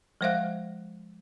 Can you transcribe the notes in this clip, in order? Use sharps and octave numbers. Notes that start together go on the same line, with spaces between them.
F3 G#3 C5 E5 F5 F#6